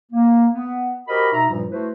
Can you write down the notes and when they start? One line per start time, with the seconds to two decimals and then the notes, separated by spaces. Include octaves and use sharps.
0.12 A#3
0.54 B3
1.08 F#4 G4 A#4 C5 D#5 B5
1.32 B2 D#4 E5 A#5
1.49 G2 A#2 F3 G3
1.70 A3 E4 F#4 B4 C5